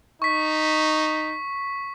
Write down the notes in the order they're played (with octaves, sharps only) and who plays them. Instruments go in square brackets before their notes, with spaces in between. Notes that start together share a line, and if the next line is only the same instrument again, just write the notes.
[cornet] D#4 [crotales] C#6 B6